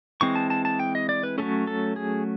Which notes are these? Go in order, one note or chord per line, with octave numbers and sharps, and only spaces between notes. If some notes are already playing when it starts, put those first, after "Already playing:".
E3 G#3 C4 C#6
A5
A5
A5
G5
D#5
D5
B4
F#3 A3 C#4 A4
A4
G#4